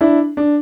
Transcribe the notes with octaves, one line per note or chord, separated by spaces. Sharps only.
D4 E4
D4